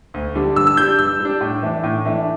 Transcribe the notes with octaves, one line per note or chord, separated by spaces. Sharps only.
D2
D3 G3 D4
G2 E6
E6
G3 D4 G6
G2 E6
G3
D4
A2
E3 A3 D4
A2
E3 A3 D4